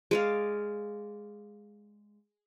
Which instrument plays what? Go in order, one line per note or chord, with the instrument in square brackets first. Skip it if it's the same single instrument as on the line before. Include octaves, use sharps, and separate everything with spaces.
[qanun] G#3 D5 F5